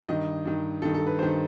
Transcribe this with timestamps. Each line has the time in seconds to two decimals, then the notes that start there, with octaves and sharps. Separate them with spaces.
0.09 G2 D#3 D#5
0.45 G2 D#3
0.82 G2 D#3 A4
0.94 A4
1.06 B4
1.19 G2 D#3 C5